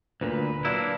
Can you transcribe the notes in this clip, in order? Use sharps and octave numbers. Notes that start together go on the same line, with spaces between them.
D2 A#2 B4
F#3 A#3 D4 E4